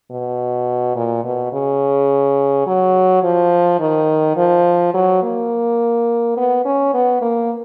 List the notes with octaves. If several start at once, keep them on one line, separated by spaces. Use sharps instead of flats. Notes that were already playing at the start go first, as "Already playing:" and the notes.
B2
A#2
B2
C#3
F#3
F3
D#3
F3
F#3
A#3
B3
C#4
B3
A#3